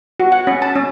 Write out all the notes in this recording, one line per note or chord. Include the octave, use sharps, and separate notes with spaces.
F#4
F#5
C#4
A5
C#4